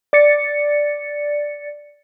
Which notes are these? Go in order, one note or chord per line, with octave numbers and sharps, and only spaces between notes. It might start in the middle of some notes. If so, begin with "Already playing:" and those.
D5 A6 C#7